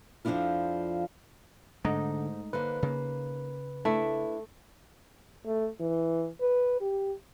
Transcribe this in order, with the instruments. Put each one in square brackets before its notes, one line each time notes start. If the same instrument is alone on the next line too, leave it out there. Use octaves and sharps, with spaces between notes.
[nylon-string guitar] F2 F3 A3 D4 E4 F4
[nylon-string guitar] G#2 [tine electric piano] D3 [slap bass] G#3 A3 [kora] D#4
[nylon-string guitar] D3 A#3 C5 [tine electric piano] B4
[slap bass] C#3 [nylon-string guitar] A#3
[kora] A3 [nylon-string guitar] D4 E4
[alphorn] A3
E3
B4
G4